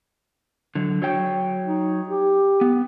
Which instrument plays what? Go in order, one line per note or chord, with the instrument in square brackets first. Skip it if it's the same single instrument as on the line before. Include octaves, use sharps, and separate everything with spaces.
[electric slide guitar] D3 F#3
F#3 C#5 G5
[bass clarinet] D#4
G4
[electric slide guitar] B3